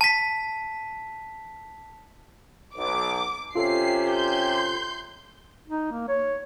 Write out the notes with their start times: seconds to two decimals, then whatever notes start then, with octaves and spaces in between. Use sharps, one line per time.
0.01 A5 B6
2.75 B1 D6
3.55 C3 C#4 F4 G4 A4 C7
4.12 C6 G6
5.68 D#4
5.92 A#3
6.09 C#5